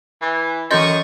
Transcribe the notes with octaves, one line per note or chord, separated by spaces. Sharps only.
E3
F#2 E3 D#5 C6 C#6 D#6 G6 A6